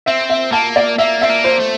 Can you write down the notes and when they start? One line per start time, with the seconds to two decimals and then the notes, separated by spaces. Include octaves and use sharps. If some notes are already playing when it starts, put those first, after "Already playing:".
0.06 C4 E5
0.30 E5
0.52 A#3 A5
0.76 D5
0.98 A#3 E5
1.21 C4 E5
1.30 A#3
1.44 C5
1.60 A3